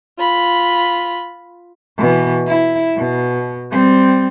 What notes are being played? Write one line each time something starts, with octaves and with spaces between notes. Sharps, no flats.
F4 B5
B2 E3
E4
B2
G3 C4